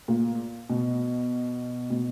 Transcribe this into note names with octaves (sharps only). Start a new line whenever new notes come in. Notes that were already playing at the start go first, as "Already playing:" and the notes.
A#2
B2
B2